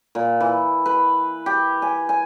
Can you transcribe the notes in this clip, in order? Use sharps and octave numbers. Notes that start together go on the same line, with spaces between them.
A#2
E3
B4
G4
G#5
G#5